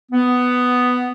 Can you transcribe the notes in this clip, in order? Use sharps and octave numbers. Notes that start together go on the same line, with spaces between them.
B3